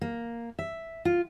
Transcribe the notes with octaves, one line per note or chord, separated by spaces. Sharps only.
A#3
E5
F4